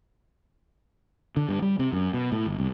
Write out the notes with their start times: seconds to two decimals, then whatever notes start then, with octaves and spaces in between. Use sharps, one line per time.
1.37 D3
1.49 G2
1.62 G3
1.79 C3
1.92 F#2
2.14 B2
2.32 A2
2.46 G1
2.58 C2